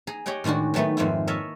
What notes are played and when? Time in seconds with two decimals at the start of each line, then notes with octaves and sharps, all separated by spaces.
0.07 G#4 A#5
0.26 G4 C#5 D#5 F#5 G5
0.44 A2 D#3 G#3 D4 F#4
0.74 D#3 F#3 A3 B3 D#4
0.97 F2 G#2 D#3 A#3 D#4 E4
1.27 A#4 C#5 D#5 E5 A5